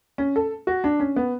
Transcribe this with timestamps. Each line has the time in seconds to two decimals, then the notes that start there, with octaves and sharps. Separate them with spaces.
0.18 C#4
0.36 A4
0.67 F#4
0.84 D4
1.00 C#4
1.16 B3